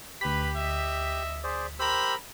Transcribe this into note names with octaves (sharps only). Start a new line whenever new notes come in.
D2 G4 B4 B5 B6
D#5 E5
G#4 C5 D5
G4 A#4 C5 B5 E6